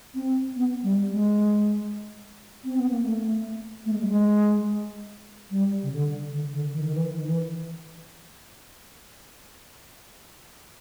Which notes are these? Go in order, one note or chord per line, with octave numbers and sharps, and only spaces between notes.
C4
B3
G3
G#3
C4
B3
A#3
A3
A3
G#3
G3
G#3
G3
C#3
D3
D3
D3
D#3
D#3
E3
D#3
E3